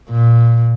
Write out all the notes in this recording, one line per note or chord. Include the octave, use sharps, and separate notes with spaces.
A#2